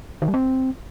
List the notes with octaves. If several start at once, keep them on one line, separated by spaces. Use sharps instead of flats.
D#3
G3
C4